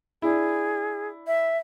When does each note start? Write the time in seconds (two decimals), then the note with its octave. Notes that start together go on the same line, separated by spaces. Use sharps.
0.22 D4 E4 G#4
1.27 E5